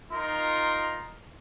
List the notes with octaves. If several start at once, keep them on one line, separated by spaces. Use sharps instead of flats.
D#4 F4 A#4 C6